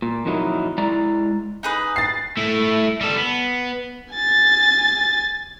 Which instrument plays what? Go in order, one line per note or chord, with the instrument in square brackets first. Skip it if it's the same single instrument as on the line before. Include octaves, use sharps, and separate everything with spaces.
[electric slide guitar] A#2
F2 A#2 D#3 F#3 D#4 E4
G#3 E4 D5 A#5
[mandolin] D#4 G#4 B4
[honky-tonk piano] A6 C7
[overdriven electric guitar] A3 E4
G3 A4
B3
[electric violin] G#5 A6